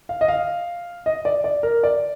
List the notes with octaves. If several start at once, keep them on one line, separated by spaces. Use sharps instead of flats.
F5
D#5
F5
D#5
D5
D5
A#4
D5